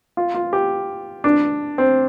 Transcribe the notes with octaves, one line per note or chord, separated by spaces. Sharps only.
F4
F4
G4
D4
C4